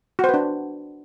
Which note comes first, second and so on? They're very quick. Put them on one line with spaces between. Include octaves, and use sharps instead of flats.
F#4 C5 B4 D4